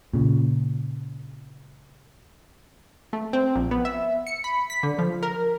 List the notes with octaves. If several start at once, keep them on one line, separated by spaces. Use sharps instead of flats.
A#2 C#3
A3
C4
A#1
B3
E5
C#7
B5
B6
D3
F3
A#4